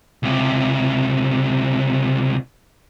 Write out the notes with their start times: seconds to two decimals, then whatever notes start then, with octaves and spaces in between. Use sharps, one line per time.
0.23 C#2 C3